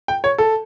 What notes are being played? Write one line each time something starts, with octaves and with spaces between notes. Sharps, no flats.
G5
C#5
A4